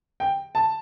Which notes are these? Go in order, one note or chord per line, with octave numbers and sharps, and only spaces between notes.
G5
A5